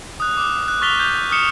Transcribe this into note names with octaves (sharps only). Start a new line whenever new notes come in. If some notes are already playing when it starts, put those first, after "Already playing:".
D#6 F#6
D6 F6
F#6
C#6 F6 A6 B6 F7 G7
G6
D#6 F6 C#7 E7 F7